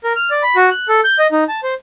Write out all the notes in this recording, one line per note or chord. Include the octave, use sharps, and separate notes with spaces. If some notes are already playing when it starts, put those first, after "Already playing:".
A#4
F6
D5
B5
F#4
F#6
A4
G6
D#5
D#4
A5
C5